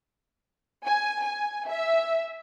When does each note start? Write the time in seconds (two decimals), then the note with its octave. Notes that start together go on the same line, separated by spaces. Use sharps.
0.85 G#5
1.22 G#5
1.68 E5